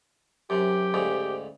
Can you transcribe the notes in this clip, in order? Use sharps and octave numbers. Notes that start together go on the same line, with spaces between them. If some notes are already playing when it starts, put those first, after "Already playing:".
F#2 C3 G4
D2 G#2 C#3